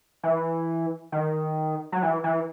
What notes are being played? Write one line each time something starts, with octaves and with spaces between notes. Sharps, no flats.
E3
D#3
F#3
E3
E3